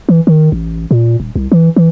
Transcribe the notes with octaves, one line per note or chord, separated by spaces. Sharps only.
E3
D#3
A1
A#2
D#1
C2
E3
E3